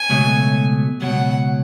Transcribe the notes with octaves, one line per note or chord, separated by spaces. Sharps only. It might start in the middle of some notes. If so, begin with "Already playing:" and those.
Already playing: G#5
C#2 B2 F#3 A3
C#2 B2 F#3 F#5